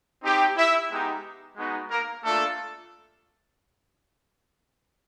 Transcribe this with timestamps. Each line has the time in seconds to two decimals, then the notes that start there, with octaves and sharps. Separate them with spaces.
0.23 C4 D#4 G4
0.57 E4 E5
0.90 G#3 B3 D#4 G4
1.57 G#3 B3 D#4 F#4
1.91 A#3 A#4
2.23 A3 A#3 D4 F4 A4